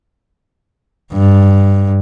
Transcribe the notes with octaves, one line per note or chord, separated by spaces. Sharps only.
G2